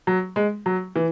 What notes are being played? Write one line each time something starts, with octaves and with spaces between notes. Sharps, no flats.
F#3
G#3
F#3
E3